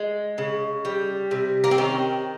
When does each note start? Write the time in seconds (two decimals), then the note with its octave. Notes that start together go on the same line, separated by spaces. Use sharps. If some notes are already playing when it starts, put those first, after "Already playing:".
Already playing: G#3
0.38 C#3
0.85 G3
1.31 C3
1.64 A#3
1.71 C4
1.78 D#3 C#4